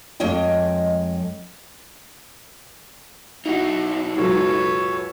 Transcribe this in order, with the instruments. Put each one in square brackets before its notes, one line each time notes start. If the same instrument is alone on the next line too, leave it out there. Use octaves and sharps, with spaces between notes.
[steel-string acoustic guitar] F2 G#3 C#5 D#5 G5
[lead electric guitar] B1 D#4 [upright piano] E4 F#4 F#5
[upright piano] C#2 F#2 B2 [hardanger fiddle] A4 B4 [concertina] C#5